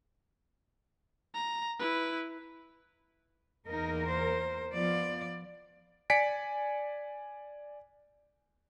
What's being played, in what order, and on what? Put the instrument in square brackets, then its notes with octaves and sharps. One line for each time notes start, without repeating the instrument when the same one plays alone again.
[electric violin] A#5
E4 B4
[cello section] E2 A#3 A#4 [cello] D#4
[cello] C5
[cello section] F3 B3 F4 [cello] D5
[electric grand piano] D5 G#5 B6 C#7 D7